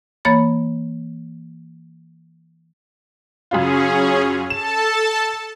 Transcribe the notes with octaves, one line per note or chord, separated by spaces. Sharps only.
E3 A#3 C#5 B5 A6
F#2 C#3 C#4 F4 G#4
A4 A5 E7